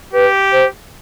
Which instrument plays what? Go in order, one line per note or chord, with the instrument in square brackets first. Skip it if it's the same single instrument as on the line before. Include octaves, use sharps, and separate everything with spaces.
[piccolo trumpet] G4 [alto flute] B4
[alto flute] C5